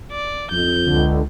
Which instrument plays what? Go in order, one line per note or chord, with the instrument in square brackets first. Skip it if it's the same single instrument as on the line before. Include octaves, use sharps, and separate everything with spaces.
[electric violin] D5
[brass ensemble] F2 [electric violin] G6
[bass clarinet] C#2 [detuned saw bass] D3